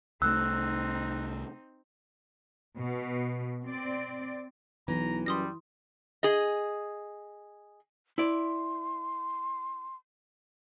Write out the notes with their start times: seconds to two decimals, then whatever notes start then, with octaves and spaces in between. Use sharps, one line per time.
0.22 C2 A3 C4 D#4 E6 F#6
2.77 B2
3.64 C4 D5
4.88 B1 E3 A#5
5.26 F#2 G3 C6 D#6 A#6
6.23 G#4 D#5
8.18 E4 D5 C6